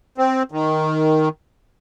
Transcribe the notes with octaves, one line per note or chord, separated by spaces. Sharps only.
C4
D#3